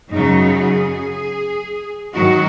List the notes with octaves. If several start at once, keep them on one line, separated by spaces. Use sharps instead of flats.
F#2 C#3 F#3 D#4
G#4
F#2 D#3 F#3 F#4